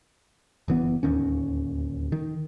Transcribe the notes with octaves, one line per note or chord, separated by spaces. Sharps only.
F#1 E3 B3
D1 D#2 D#3 C#4
D#3